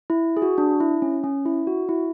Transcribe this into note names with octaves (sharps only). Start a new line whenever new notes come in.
E4
G#4
F#4
D4
E4
C#4
C#4
E4
F#4
E4